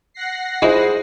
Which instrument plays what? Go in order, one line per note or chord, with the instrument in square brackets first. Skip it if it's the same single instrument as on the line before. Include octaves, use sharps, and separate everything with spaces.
[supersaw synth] F#5 A#6 C7
[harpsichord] D#4 E4 [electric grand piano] G#4 C5